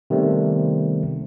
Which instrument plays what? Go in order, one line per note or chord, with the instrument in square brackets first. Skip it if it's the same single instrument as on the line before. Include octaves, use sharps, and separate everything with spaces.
[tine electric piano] C3 D#3 G3 A3 B3 C4